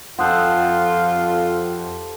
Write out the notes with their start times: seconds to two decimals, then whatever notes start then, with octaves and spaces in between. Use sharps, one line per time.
0.19 F2 F4 G4 A4 C5 F#5 D#6 F#6